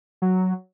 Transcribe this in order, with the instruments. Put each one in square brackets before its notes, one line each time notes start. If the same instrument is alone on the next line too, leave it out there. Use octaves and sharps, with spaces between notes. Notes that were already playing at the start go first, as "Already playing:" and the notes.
[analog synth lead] F#3